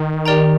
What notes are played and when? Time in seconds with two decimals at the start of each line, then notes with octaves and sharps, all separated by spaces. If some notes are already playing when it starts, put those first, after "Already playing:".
Already playing: D#3
0.26 G4 A#4 D5 G5 A#5